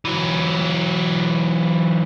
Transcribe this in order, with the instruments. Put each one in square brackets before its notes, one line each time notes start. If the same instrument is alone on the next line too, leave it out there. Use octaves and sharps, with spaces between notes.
[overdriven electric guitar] E3 F#3